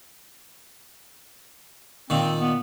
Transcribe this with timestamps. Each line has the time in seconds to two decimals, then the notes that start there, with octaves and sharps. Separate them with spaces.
2.10 A#2 D#3 C4
2.40 B3